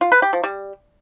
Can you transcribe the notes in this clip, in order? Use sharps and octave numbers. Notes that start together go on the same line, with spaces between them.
F4
B4
G4
F3
G3